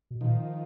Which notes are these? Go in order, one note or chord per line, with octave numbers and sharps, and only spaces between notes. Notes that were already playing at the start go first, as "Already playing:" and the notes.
B2
A#2 D#3 F3